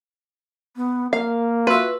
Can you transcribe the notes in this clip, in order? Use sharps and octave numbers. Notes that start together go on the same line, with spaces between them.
B3
A#3 A#4 F5
F4 F#4 B4 E5